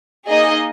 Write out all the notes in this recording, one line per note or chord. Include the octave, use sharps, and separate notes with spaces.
A#3 D#4 G#4 D#5